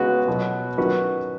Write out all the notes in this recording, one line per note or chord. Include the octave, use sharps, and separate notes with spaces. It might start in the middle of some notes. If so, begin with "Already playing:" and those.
Already playing: C#3 G#3 B3 F#4 B4
B2 F#3 B3
D#3 F#3 C#4 F#4 B4